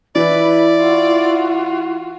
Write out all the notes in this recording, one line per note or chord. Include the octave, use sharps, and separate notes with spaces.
E3 E4 B4 D5
F4 F#4